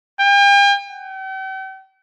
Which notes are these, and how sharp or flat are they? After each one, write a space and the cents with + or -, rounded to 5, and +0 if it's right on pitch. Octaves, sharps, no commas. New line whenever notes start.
G5 +45
G5 -45